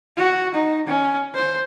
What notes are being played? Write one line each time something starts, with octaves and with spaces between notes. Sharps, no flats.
F#4
D#4
C#4
C5